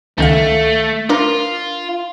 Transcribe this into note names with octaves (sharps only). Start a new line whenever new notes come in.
C#2 D#3 A3 F5
D4 F4 A#4